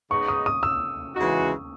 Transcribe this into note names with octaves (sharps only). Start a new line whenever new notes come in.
C#3 G#3 B3 D#4 C#6
D#6
D#6
E6
C#3 E3 G#3 D#4 F#4